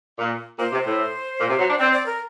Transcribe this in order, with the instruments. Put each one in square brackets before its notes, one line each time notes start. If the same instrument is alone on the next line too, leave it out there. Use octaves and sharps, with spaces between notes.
[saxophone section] A#2
[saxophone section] A#2 [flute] C5
[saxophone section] C3
A2
A#2
C3
F#3
D4
[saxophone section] C4 [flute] D5
[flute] D5
A#4